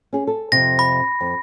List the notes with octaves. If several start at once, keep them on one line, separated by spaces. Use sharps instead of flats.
C#4 G#4
A4
F2 C3 A#6
B5
F2